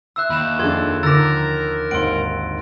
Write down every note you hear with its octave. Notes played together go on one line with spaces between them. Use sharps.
E5 C6 E6 F#6
D#2 B5 E7
F2 D4 G#4 A5 C6 G#6
D#2 D3 D#3 A#4 D6 E6 A6 A#6
G#1 D#2 F#5 C6 D7